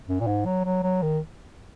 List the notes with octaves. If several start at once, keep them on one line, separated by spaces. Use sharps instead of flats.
F#2
A#2
G#2
F#3
F#3
F#3
D#3